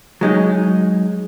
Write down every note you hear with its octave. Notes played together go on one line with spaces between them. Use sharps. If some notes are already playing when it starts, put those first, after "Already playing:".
F#3 G#3 D#4